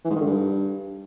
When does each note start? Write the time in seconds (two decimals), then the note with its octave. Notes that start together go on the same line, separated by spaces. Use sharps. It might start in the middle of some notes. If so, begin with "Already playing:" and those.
0.04 E3
0.10 G#2
0.15 D#3
0.21 D3
0.26 G2